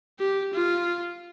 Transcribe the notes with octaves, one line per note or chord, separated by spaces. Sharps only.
G4
F4